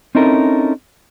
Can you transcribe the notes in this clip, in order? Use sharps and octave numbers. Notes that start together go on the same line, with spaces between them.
C4 C#4 D#4 E4 A4 A#4